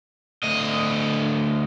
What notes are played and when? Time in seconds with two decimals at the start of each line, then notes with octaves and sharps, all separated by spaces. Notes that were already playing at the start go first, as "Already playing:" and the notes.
0.43 D2 D#5